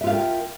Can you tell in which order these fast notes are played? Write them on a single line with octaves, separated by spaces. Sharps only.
E5 F4 F5 A#4 G5